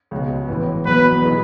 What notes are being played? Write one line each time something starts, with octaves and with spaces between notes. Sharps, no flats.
C#2 B2 G#3
A1 A2 E3 B3
E1 E2 B2 F#3 B4
B2 G#3 B3 E4